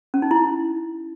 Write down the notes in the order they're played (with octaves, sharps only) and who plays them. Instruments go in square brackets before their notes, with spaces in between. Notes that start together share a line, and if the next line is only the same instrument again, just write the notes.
[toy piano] C#4
D#4
E4